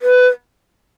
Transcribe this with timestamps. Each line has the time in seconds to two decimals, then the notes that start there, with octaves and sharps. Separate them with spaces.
0.02 B4